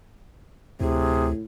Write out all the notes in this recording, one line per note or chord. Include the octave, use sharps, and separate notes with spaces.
D2 A2 C3 G#4